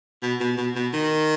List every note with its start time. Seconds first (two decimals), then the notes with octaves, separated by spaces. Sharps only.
0.22 B2
0.40 B2
0.57 B2
0.76 B2
0.94 D#3